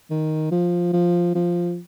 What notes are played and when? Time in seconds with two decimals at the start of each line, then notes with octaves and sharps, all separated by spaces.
0.10 D#3
0.51 F3
0.93 F3
1.35 F3